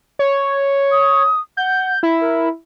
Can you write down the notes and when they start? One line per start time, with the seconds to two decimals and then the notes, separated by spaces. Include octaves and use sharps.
0.19 C#5
0.91 D#6
1.57 F#5 G6
2.03 E4 B5
2.21 A#4